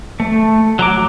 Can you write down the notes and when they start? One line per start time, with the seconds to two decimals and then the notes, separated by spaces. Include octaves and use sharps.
0.20 A3
0.79 F#3 A#5 D6